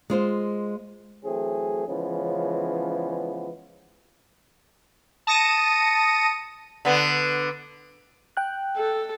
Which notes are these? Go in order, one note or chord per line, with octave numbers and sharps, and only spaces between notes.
G#3 F4 C5
E3 F#3 A3 C4 G#4
C#3 E3 F3 G#3 B3 C#4
A5 D#6 A#6 C#7 D#7
D3 B3
G5 F#6
A4